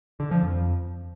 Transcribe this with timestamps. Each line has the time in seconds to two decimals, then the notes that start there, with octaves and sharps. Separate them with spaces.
0.20 D3
0.31 F3
0.43 F2